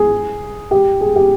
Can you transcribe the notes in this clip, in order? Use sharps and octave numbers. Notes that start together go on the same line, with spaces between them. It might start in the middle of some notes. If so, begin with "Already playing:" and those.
Already playing: G#4
G4
G#4
G4